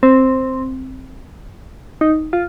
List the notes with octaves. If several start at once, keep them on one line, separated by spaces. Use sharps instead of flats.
C4
D#4
F4